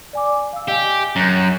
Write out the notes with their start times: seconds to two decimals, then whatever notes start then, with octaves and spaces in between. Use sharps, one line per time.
0.13 D5 G#5 D6
0.53 F5 E6
0.68 G4 D#5 G#5
1.16 F#2 A#5 F#6 G6